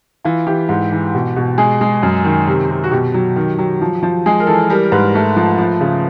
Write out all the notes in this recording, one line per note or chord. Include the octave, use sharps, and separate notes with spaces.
E3 F4
E3 G4
G#2
E3
B2
B2
G#3 G#4
G#3
F#2
D#3
C3
C3
F#4
B2 G4
F#3
D#3
F#3
F3
F3
G#3 G#4
A#4
E3 A4
G3 A#4
G#2 B4
A3
F3
F3
C#3